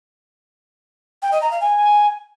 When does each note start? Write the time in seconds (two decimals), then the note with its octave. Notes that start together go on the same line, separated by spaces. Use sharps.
1.22 G5
1.32 D#5
1.41 A#5
1.51 F5
1.60 G#5